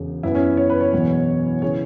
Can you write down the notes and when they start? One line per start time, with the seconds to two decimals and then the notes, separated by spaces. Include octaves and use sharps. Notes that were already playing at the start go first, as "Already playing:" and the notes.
Already playing: E1 C#3
0.23 F#2 E3 B3 E4
0.35 C#4
0.57 C#5
0.70 B4
0.81 C#5
0.93 E1 E2 B2 F#3
1.62 C#3 E3 B3 C#5